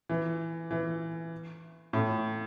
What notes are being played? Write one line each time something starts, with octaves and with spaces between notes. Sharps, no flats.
E3
E3
A2